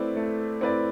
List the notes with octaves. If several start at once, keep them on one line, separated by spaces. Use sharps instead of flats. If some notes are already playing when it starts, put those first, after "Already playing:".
Already playing: A3 C4 E4 B4 D5
A3
C4 E4 B4 D5